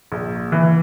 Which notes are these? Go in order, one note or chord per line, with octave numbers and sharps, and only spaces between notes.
A#1
E3